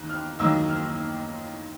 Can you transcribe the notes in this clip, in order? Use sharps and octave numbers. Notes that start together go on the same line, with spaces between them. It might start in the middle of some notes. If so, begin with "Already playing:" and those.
Already playing: D#2 D#3 A#3 F#6
F6
D#2 D#3 F#3 A#3 E6
F6